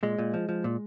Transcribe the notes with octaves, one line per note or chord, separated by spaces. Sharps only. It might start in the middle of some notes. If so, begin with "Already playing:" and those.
A#2 G#3
A#2
F3
F3
A#2